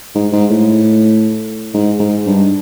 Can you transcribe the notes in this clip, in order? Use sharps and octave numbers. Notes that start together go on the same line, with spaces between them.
G#2
G#2
A2
G#2
G#2
G2